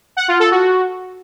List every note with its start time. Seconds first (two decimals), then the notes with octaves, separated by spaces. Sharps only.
0.17 F#5
0.28 F4
0.40 A4
0.51 F#4